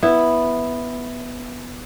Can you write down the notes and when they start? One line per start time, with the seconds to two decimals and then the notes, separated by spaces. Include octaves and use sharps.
0.03 B3 E4